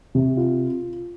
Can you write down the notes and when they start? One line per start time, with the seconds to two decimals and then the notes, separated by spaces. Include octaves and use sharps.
0.15 C3
0.37 F4